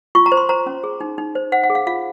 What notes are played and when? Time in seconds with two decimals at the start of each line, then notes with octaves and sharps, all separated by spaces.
0.15 F4 C#6
0.26 A#5
0.32 C5
0.37 C6
0.49 C5 A#5
0.66 C#4
0.84 G#4
1.01 D#4
1.18 D#4
1.35 C5
1.52 C5 F#5
1.63 F#5
1.70 G#4
1.75 F5
1.87 F4 F5